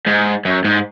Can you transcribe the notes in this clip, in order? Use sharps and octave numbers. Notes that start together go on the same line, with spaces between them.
G#2
F#2
G#2